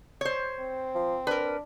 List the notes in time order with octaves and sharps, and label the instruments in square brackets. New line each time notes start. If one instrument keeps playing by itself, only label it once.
[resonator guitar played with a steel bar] C5 C#5
[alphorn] C4
[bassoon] F3
[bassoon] D4 [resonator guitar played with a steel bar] A#4 B4